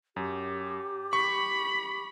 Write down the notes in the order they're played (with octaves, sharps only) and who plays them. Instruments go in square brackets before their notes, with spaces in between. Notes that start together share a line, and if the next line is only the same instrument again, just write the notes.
[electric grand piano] F#2 [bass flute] G4
[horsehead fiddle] B5 [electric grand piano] C#6